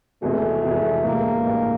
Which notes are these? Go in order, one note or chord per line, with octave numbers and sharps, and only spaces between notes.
F1 E2 C3 E3 G#3 A3
F1 E2 C3 E3 G#3
A1 G2 E3 G#3 A#3
A1 G2 E3 G#3